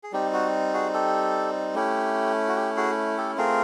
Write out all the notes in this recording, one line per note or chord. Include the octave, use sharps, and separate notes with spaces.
G#4
G3 C4 D#4 G4
F#4
F#4 G#4
G4 A4
A3 C#4 E4 G4
F#4
G4
F#4 G#4
G4 A4
A3 C4 F4 G#4 A#4